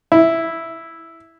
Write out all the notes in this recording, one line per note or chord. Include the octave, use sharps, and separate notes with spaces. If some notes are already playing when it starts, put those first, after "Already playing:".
E4